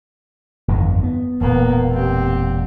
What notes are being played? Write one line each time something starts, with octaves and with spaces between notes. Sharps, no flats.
G1 F2 D#3
B3
E1 A#2 A#3 B3
C4 G4